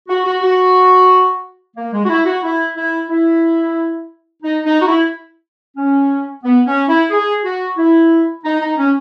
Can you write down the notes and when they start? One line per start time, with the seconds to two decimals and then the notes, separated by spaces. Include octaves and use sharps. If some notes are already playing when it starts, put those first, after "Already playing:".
0.09 F#4
0.25 F#4
0.42 F#4
1.76 A#3
1.92 G#3
2.04 F#4
2.09 E4
2.25 F#4
2.43 E4
2.76 E4
3.09 E4
4.43 D#4
4.65 D#4
4.80 F#4
4.87 E4
5.76 C#4
6.44 B3
6.66 C#4
6.88 E4
7.10 G#4
7.44 F#4
7.77 E4
8.44 D#4
8.60 D#4
8.77 C#4